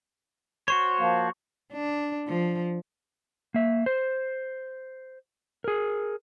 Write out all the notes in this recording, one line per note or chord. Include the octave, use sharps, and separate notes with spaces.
F#4 C5 C#5 C#6
F3 A#3
D4
F3
A#3 E5
C5
G#4 A#4